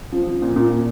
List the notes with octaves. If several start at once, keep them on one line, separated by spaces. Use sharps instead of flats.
F3
F3
A#2
A#2
A#2